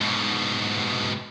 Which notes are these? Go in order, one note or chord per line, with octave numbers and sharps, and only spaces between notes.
G#2 B2